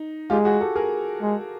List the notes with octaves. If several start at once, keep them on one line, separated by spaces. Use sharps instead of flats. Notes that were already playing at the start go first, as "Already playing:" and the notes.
Already playing: D#4
G#3 F4 G4
F#4 G#4
G4 A4
G#4 A#4
G#3